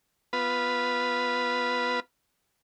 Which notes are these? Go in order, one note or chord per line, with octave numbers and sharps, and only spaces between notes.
B3 F4 B4